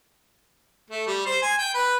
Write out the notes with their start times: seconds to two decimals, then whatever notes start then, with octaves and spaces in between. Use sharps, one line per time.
0.90 A3
1.07 G3
1.26 C5
1.42 G#5
1.59 G5
1.74 B4